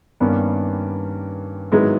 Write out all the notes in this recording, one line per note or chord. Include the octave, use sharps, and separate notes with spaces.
G2 D#3 G3 A#3 B3 C#4
G#2 D#3 F#3 G#3 B3 E4